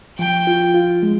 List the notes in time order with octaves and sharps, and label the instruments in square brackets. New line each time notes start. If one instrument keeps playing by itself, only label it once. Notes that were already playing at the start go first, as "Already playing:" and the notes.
[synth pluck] F3 [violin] G5
[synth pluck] F4
F4
G#3